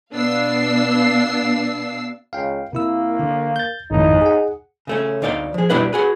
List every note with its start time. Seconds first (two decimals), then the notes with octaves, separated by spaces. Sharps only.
0.13 B2 B3 D4 F5 E6 C7
2.33 C#2 F5 G5
2.73 C3 A#3 E4 E6
3.19 D3
3.56 G6 A6
3.91 G#1 F2 A2 D#4
4.21 G#4 F#5
4.87 C#3 A3 C#4
5.22 D2 D#4 D5 F5 G5
5.54 F3 G#4
5.70 C2 B2 G3 D4 E4 B4
5.93 F#4 G#4 B4